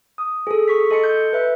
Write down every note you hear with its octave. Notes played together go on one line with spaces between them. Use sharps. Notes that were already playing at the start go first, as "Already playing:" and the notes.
D#6
G#4 A4
C#6 B6
A4 D#5 A5 C6 C#7
G6
B4 E5 B5